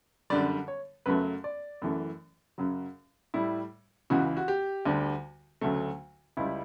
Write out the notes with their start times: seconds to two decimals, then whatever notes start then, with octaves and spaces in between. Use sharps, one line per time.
0.30 F#2 D3 G3 D5
0.68 C#5
1.06 F#2 C#3 F#3 A3 B4
1.44 D5
1.82 F#2 E3 A3
2.58 F#2 C#3 F#3
3.34 A2 G3 E4
4.10 C#2 C#3 E3 F#4
4.37 F#4
4.48 G4
4.85 D2 D3 G3
5.61 D2 C#3 F#3 A3
6.37 C#2 C#3 G3 E4